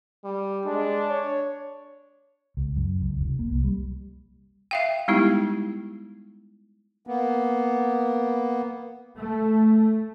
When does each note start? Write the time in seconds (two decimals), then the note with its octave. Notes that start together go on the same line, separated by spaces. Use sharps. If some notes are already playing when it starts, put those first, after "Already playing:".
0.24 G3
0.66 G#3 D4
1.09 C#5
2.57 C#2
2.76 F#2
3.01 C#2
3.19 F1
3.39 A#3
3.51 C2
3.64 G3
4.71 E5 F5 G5
5.08 G3 G#3 B3 D#4 E4 G4
7.07 A#3 B3
9.16 A3